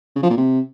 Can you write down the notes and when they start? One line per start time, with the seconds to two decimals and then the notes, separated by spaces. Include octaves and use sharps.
0.16 C#3
0.23 F3
0.30 A#2
0.37 C3